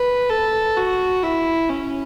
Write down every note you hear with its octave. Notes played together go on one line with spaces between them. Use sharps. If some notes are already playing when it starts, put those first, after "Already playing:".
Already playing: B4
A4
F#4
E4
C#4